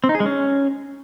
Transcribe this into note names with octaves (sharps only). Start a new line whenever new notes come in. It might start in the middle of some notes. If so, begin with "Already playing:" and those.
C4
D#4
G#4
G#3
C#4